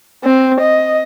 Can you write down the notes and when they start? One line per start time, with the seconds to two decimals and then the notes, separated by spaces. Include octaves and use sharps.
0.24 C4
0.61 D#5